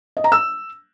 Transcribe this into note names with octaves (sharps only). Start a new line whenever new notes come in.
D#5
A#5
E6